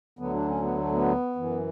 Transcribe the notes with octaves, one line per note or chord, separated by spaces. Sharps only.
D2 D3 F#3 B3
D4
C#4
B3
A3
B3
F#2 E3